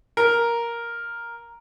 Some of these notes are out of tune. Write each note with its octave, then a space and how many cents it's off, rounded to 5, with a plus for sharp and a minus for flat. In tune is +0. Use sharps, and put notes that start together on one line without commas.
A#4 +5